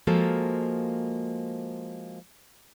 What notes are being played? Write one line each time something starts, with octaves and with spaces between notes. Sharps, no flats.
F3 G#3 A#3 F#4 A4